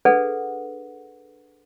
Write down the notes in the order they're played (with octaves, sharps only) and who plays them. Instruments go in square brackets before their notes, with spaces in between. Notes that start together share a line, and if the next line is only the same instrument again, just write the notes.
[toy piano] D4 G#4 A4 B4 F#5